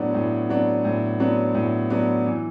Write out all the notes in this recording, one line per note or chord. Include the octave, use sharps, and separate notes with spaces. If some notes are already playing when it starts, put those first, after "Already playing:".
Already playing: A2 F#3 B3 D4
A2
F#3 B3 D4
A2
F#3 B3 D4
A2
F#3 B3 D4
E3